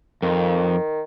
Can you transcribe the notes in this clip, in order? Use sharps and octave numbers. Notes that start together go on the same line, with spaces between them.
F2 D#3